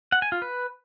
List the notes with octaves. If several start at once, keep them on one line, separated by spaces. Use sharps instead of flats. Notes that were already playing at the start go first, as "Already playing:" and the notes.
F#5
G#5
F4
B4